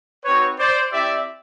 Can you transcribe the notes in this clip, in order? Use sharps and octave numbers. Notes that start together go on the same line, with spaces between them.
C4 D#4 F#4 B4 C#5
C5 D5
C4 E4 G4 D5 E5